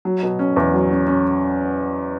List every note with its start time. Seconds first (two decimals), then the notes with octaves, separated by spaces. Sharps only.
0.05 F#3
0.23 B2
0.39 C#4
0.56 E2
0.74 F#3
0.91 C#4
1.07 C#4